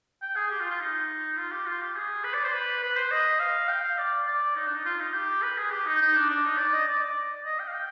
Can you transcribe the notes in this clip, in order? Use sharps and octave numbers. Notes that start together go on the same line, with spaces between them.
G5
G#4
G4
F4
F4
D#4
F4
G4
F4
G4
G#4
B4
D5
C5
B4
B4
C5
D#5
F5
G5
F5
D5
D5
D#4
D4
D#4
F4
D#4
G4
B4
G#4
G4
D#4
D#4
D4
D4
D#4
D5
D#5
D5
D5
D#5
G5
F5
G5